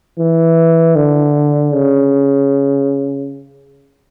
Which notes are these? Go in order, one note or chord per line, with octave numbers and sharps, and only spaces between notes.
E3
D3
C#3